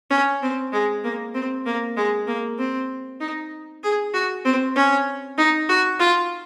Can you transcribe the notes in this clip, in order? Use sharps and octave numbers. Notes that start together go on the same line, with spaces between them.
C#4
C4
G#3
A#3
C4
A#3
G#3
A#3
C4
D#4
G#4
F#4
C4
C#4
D#4
F#4
F4